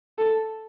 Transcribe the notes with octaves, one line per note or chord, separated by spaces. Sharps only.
A4